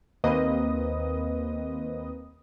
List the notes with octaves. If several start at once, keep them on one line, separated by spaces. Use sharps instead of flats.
D#2 A#3 C4 B4 D#5 D#6